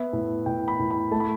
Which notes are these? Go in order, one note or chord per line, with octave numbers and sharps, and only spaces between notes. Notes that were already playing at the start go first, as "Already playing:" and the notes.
Already playing: B3 E5
A2
A2 G5
B5
A2
B5
A3 A5
B5